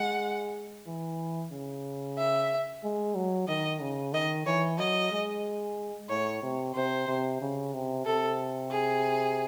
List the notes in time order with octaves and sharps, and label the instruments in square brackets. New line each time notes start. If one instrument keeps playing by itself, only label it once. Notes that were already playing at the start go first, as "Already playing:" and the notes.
Already playing: [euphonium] G#3 [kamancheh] F#5
[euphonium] E3
C#3
[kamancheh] E5
[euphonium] G#3
F#3
[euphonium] D#3 [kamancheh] D#5
[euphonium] C#3
[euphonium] D#3 [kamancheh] D#5
[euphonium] E3 [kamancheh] C#5
[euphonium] F#3 [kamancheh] D#5
[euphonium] G#3
[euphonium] A2 [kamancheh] C#5
[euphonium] C3
[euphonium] C3 [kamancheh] C5
[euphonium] C3
C#3
C3
[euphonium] C3 [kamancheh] A4
[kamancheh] G#4